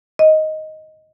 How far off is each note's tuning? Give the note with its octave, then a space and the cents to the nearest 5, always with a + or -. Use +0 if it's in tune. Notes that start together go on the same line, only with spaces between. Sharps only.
D#5 +5